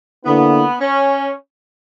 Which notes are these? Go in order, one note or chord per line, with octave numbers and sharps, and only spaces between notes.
D3 A#3 B3 E4
C#4